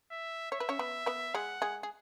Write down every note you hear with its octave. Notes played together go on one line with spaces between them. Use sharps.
E5
C#5 E5
B4
C#4 C#5
B3 B4
B3 B4
G#3 G#4 F#5
G#3 G#4
G#4